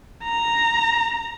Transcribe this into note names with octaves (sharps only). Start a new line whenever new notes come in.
A#5